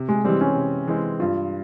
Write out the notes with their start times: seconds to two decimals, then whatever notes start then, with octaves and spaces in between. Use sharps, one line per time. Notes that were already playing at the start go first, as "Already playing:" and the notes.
Already playing: C3
0.09 G#3
0.24 E3 G3 G#3 C4
0.41 C#4
0.56 C3
0.88 E3 G#3 C4
1.20 G2 F4